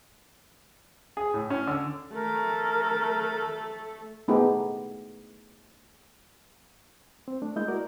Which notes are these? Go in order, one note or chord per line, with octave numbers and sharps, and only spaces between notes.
G#4
A2
C#4
D3
A3 A4 A#4
A3 B3 D#4 G4 G#4
C4
A3 D4
G#3 A#3 E4 D#5 G6
F#4 A#4 D5